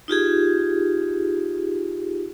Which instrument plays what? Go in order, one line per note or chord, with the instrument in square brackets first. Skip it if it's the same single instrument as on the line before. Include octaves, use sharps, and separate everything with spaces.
[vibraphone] D#4 F4 G4 G#4